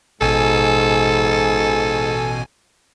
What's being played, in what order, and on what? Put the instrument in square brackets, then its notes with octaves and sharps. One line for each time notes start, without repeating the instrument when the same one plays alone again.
[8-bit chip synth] A1 B2 G#5 [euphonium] G#2 [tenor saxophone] A4